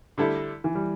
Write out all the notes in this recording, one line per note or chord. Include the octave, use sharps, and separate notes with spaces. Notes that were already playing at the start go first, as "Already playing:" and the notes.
D3 G3 E4 A4
E3
G3